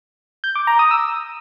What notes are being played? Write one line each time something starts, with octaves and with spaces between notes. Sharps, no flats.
G6
D6
A#5
D#6
E6